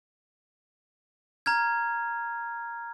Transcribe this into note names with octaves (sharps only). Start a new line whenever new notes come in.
A#5 F6 G#6